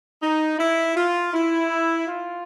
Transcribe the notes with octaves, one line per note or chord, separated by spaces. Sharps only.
D#4
E4
F4
E4
F4